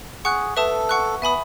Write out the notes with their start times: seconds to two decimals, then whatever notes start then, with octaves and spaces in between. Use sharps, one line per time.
0.25 G#4 F#5 C#6 F#6
0.57 A4 B4 E5 A5 D#6
0.89 F#5 C#6 F#6
1.22 B3 E5 G#5 B5 D#6